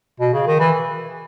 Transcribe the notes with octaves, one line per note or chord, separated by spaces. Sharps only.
B2
C#3
D#3
E3